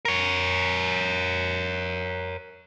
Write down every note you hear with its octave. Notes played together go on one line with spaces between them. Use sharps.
A#4 C#5